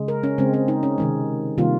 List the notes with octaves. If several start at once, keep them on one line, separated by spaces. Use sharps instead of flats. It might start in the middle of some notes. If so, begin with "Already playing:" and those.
Already playing: C#3 G#3
A#4
C#4
C#3 G#3 C4
C4
D#4
C#4
C3 D#3 G#3
C3 D#3 G3 A#3 F4